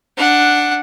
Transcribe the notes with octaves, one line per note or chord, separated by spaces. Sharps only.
D4 F#5